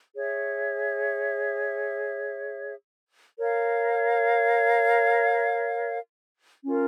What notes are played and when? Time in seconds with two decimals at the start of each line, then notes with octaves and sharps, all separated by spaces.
0.15 G#4 C#5 E5
3.39 A#4 C#5 F5
6.64 C#4 F4 A#4